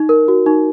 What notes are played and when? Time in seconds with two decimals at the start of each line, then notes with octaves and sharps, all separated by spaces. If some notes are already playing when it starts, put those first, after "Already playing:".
Already playing: D#4
0.09 A#4
0.28 F#4
0.46 D#4